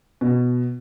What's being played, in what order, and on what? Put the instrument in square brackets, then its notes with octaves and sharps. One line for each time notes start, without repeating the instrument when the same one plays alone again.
[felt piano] B2